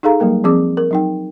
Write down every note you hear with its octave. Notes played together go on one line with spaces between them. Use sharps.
D#4 G#4 A4 F5 A#5
F#3 G3 A#3 A#4
F3 C4 G#4 D6
A#4
F#3 D#4 G5